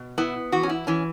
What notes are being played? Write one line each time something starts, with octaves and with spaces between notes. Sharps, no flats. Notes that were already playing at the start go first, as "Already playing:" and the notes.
Already playing: B2
B3 E4
E3 F#4
C#4
E4
E3 C#4